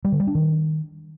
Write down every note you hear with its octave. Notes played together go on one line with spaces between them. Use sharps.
G3
D3
G3
D4
D#3